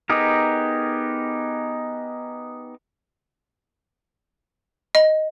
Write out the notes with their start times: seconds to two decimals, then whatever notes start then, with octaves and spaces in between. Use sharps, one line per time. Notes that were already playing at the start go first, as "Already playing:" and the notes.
0.10 B3 D#4 G4 G#4 A#4
4.95 D#5